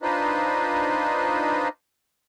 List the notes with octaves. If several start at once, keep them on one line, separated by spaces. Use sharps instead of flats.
D4 D#4 F4 B4 C5 D#5